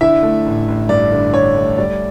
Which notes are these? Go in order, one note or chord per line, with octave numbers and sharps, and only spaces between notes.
D3 E4 E5
A3
A1
A1
G2 D5
D3
D3 C#5
A3
G3 D5